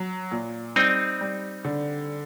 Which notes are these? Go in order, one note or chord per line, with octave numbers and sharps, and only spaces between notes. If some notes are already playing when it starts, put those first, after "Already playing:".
Already playing: F#3
A#2
G3 C4 D#4
G3
D3